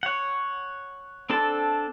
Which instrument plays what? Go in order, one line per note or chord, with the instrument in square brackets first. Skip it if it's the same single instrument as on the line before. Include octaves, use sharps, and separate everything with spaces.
[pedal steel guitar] C#5 F#5
C4 D4 A4 A5